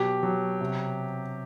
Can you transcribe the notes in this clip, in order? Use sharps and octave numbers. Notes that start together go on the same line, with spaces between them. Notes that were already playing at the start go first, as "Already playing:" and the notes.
Already playing: B2 F#3 G4
F#3
C3